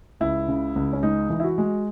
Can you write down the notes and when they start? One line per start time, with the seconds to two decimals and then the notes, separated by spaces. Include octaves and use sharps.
0.20 C#2 E4
0.48 C#3
0.76 C#2
0.93 C#4
1.02 G#3 D#4
1.30 E3
1.40 E4
1.44 F#4
1.58 G#3